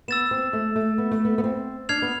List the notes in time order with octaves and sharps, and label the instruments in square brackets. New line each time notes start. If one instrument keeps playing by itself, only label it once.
[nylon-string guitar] B3 [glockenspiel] E6 A6 E7
[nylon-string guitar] C4
A3
A3
B3
A3
B3
B3
C4
[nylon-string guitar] D4 [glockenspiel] F6 G#6 C7 F7
[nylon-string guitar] B3